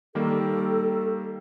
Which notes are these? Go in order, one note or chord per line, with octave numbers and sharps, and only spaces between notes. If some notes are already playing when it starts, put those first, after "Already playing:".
D#3 G3 A#3 A4